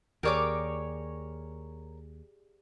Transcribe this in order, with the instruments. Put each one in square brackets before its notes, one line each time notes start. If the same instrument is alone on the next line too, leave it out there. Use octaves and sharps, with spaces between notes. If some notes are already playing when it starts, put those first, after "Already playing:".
[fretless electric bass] D#2 [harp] G4 G#4 D5 [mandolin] A#4 C#5 D6